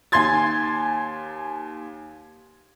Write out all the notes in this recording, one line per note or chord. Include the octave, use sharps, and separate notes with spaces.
D#2 G#5 C6 G#6 A6